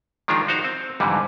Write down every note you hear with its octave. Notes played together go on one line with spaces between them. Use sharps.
D#3 F3 G#3 D4 F4
D#4 F#4 C5 F5
C4
F2 G#2 D3 E3 G3